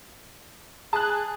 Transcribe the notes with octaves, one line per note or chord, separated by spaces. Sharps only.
G#4 A5 F#6